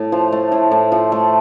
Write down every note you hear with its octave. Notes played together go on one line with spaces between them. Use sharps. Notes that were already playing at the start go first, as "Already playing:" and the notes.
Already playing: A2
F3
A3
A2
A2
F3
A3